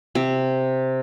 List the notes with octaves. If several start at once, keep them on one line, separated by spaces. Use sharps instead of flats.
C3